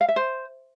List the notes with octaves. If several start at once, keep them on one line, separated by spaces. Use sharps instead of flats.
F5
E5
C5